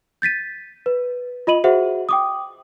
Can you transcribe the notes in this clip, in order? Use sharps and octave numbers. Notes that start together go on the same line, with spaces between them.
G6 A6 B6 D#7
B4
F4 D#5 B5 D#7 F#7
F#4 G#4 C5 E5 F#5
G5 D6 D#6